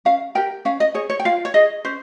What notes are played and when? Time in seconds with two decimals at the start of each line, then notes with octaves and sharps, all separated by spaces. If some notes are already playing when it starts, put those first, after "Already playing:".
0.05 C#4 F5
0.35 G4 A#4 G5
0.65 C#4 F5
0.80 D#5
0.94 G#4 C#5
1.10 C#5
1.20 G5
1.25 F4 F5
1.45 C#5
1.54 G#4 D#5
1.85 C#4 C5